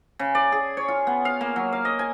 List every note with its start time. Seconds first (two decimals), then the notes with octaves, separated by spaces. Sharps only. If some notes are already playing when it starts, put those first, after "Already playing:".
0.19 C#3
0.35 D5
0.52 G#4
0.77 C#5
0.88 F4
1.07 B3
1.25 F5
1.41 A#3
1.56 F#3
1.73 F5
1.85 D#5
1.99 G#5